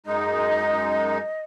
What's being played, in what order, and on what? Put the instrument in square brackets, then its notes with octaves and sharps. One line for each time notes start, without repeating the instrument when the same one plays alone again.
[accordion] F#2 G#3 D#4 [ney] D#5